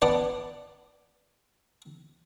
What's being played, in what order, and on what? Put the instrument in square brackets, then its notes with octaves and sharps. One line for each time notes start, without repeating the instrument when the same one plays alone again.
[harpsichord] B3 D4 D5